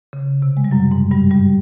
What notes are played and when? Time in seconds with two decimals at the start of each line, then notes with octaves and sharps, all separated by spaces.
0.13 C#3
0.42 C3
0.57 G#3
0.64 G3
0.71 F#2 F#3
0.91 G#2 G#3
1.11 G2 G3
1.31 G2 G3